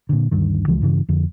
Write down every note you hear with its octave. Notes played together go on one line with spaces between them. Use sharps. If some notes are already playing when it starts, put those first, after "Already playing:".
A#2 D3
D2 G2 D#3
C#2 E3 F3 G#3
G2 C#3 E3
F2 D3